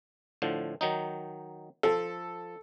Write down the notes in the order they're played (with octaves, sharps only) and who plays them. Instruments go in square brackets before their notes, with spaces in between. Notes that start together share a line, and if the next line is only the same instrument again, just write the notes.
[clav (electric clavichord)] A2 D3 F3
D#3 F#3 D#4
[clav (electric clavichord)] F3 [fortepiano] A4